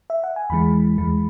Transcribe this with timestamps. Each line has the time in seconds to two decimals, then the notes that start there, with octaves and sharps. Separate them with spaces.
0.10 E5
0.24 F#5
0.36 G#5
0.50 E2 E3 G#3 B5
0.98 E2 E3 G#3